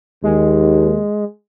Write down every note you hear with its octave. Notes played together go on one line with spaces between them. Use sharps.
D#2 G#3